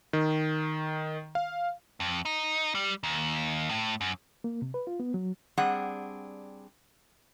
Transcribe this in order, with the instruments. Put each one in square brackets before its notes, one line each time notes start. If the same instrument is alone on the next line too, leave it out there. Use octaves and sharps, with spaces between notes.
[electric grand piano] D#3
F5
[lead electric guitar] F2
D#4
G3
D#2
A2
F#2
[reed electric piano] A#3
C3
B4
F4
B3
F#3
[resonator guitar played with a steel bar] G3 C4 D4 G#4 F#5